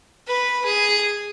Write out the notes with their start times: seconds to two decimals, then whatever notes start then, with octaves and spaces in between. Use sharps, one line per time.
0.27 B4
0.65 G#4